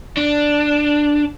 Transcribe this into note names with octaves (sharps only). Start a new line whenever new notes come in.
D4